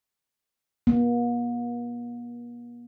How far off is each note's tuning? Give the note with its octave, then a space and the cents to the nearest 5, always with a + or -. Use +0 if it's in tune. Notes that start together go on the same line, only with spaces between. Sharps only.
A#3 +45